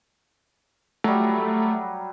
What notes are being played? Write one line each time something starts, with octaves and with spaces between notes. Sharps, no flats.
F#3 G3 A3